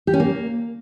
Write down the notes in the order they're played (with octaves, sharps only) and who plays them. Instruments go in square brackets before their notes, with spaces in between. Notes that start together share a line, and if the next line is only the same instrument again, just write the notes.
[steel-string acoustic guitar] G4
C#4
A#3